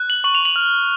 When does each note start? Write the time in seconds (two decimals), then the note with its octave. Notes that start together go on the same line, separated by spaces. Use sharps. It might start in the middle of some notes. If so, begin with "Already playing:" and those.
Already playing: F#6
0.10 F#7
0.24 C#6 F#7
0.35 F7
0.45 F#7
0.56 F6